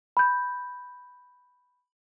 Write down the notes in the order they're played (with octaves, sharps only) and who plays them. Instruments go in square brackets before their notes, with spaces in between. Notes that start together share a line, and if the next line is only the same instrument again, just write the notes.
[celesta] B5 G6